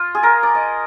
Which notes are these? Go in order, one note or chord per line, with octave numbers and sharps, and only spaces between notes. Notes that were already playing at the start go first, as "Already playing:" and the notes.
Already playing: F4
G#4
A#4
D5
D#5